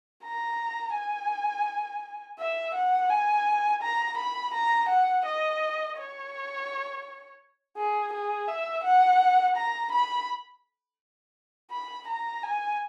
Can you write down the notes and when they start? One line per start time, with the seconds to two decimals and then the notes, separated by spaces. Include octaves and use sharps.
0.24 A#5
0.95 G#5
2.39 E5
2.75 F#5
3.10 G#5
3.82 A#5
4.18 B5
4.54 A#5
4.89 F#5
5.26 D#5
5.98 C#5
7.77 G#4
8.13 G#4
8.48 E5
8.84 F#5
9.56 A#5
9.92 B5
11.71 B5
12.08 A#5
12.43 G#5